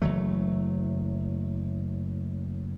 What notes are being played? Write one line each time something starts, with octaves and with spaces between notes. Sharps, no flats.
F#1 E3 F#3 A3